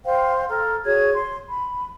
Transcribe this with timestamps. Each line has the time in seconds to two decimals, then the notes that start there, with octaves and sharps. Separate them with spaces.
0.05 C5 F5 G5
0.50 A4 A#5 F6
0.85 F#4 G#4 C#5 G#6
1.14 C6
1.48 B5